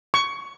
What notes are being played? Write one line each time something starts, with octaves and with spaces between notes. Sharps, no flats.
C#6